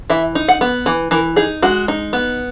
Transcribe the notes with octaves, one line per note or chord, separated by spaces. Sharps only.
E3 E5
D#4
F#5
B3
E3
E3 A#4
D#4 G#4
G#3 F#4
D#4
B3